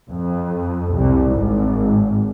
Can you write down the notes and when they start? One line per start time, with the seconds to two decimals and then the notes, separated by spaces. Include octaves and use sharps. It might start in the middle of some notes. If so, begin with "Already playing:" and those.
0.10 F2
0.95 C2
1.33 G#1